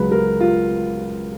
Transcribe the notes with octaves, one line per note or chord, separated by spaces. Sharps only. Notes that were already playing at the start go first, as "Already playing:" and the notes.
Already playing: C#2 C#3 F#3 B4
A#4
F4